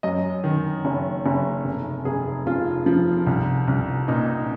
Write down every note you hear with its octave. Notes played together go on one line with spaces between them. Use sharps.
F#2 D#5
D#3
F#1
F#1
F1
F1 G#4
F1 F4
F3
C2
C2
A#2 D#4